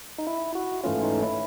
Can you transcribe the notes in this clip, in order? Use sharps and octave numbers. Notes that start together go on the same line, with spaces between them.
D#4
E4
F#4
G#2 E3 A3 C#4 F4
D#4
E4